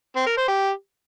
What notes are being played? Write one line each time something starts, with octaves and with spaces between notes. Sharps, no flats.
C4
A#4
C5
G4